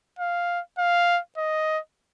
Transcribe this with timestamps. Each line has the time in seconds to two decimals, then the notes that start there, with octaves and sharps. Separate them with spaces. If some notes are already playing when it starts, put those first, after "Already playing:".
0.19 F5
0.78 F5
1.38 D#5